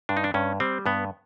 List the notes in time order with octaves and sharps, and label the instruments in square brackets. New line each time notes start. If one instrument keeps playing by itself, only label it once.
[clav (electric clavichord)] G2 D4
D#4
D4
G2 C#4
G3 C4
G2 B3